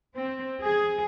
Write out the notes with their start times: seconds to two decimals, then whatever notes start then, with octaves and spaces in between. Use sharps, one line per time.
0.16 C4
0.63 G#4